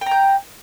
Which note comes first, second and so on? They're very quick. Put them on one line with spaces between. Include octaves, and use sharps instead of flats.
G5 A#5 G6